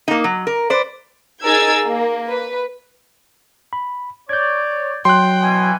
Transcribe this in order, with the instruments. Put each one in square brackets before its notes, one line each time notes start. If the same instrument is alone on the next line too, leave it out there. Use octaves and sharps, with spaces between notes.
[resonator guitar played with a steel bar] A#3 D#4
F#3
A#4
B4 C5 D5
[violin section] D#4 G#4 A#4 E6 G#6 A6
A#3
B4
[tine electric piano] B5
[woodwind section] C#5 D5 [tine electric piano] G6 G#6
[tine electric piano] F#3 [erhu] G5 [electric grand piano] C6 F#6
[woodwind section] B2 E3 G#5